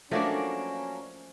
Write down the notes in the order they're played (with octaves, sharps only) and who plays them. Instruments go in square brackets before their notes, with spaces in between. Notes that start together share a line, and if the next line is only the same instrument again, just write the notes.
[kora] F3 A3 [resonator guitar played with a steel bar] F#3 A#3 D4 [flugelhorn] C#4